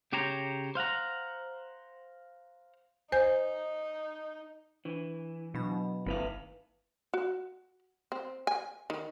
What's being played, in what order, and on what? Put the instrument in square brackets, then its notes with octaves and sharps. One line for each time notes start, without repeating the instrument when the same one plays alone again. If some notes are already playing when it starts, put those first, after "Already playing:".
[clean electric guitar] C#3 G4 C5 C#5 A#5
C5 F5 F#5 A#5
[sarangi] D#4 [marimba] C5 G#5 G6
[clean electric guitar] E3 [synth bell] D4
[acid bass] B2 [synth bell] F#3 D4 B5
[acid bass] G1 [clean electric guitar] D#2 B4 F5 [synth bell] C4 E4 E5
[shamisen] F#4
C4
G#5
D#3